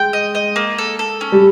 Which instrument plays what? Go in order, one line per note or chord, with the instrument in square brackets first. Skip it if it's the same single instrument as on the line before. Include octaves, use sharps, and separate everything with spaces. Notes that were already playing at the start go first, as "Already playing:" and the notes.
Already playing: [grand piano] G#3 [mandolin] G5
[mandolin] D#5
D#5
A#3
A4
A4
C#4
[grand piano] G3